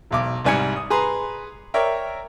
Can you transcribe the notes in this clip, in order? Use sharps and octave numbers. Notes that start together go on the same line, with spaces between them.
E1 B1 D6
C2 G#2 G3 G#5 G#6 C#7
D#6
G#4 B4 A#5 C6
A#4 C#5 D5 E5 G5